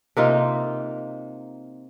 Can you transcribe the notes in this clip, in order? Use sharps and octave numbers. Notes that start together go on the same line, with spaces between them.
C3 A#3 D#4 F4